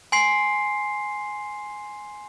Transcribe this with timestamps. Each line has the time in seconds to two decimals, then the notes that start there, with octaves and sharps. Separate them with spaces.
0.12 G#5 C6 C7